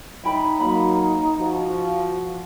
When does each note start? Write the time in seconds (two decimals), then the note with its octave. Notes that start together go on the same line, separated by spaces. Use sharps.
0.24 D#4 E4 G5 B5
0.60 F#3 A#3 B5
1.39 F3 F#4